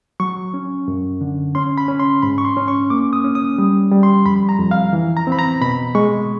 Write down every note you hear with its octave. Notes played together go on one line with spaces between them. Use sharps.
F#3 C#6
C#4
F#2
D3
C#4 C6
B5
C#4
C6
G#2 B5
C#6
C6
C#4
C#6
A#3 D6
D#6
C#4
D#6
G3
G3
C6
F2 B5
A#5
F2
F5
E3
A#5
C4 B5
A#5
B2 B5
G#3 C#6